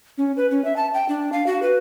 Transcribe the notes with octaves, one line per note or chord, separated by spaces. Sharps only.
C#4
B4
C#4
E5
A5
G5
D4
F5
F#4
B4